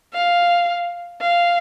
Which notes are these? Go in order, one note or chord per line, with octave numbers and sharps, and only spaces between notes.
F5
F5